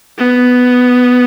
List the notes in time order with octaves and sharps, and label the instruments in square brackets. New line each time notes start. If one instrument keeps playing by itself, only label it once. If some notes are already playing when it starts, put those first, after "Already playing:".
[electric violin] B3